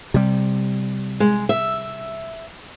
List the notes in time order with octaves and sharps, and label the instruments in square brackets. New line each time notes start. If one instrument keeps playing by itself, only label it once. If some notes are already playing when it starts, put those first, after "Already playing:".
[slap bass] C3 G3
[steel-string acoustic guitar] G#3
E5